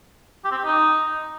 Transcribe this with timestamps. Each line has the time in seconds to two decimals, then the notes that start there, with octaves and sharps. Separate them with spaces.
0.45 G4
0.51 C4
0.58 G4
0.65 D#4